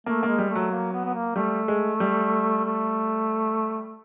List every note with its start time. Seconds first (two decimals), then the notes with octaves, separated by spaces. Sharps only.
0.06 A3 A#3
0.23 G#3 A#3
0.38 G3
0.50 A3
0.55 F#3
0.71 A#3
0.93 B3
1.05 B3
1.14 A#3
1.36 G3 A3
1.68 G#3
2.00 G3
2.65 A3